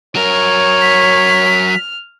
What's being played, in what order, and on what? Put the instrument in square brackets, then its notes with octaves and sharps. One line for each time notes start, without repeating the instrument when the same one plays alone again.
[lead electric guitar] F#3 A#4 [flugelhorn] C#5 [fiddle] F6
[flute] B6